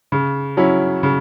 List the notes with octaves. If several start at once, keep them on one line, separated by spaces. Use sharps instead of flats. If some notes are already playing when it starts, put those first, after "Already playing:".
C#3
F#3 C#4 E4
C#3